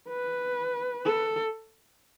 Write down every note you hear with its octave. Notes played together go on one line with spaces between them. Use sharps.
B4
A4